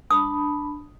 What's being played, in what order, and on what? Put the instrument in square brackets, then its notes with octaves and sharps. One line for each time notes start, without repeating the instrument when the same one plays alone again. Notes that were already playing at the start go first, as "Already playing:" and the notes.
[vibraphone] D4 A5 B5 [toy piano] D#6